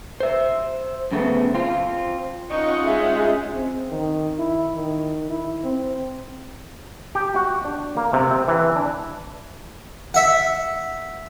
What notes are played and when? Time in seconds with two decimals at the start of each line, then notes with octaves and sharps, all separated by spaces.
0.20 C5 E5
1.11 F#2 C#3 A3 B3 C4
1.54 C4 F4
2.50 C#4 D#4 F4 F#5 C#6
2.85 G#3 E5
3.54 C4
3.91 D#3
4.38 E4
4.75 D#3
5.29 E4
5.64 C4
7.15 G4
7.36 F#4
7.65 D4
7.97 A#3
8.13 C3
8.31 C4
8.48 E3
8.76 D4
10.14 E5 F#5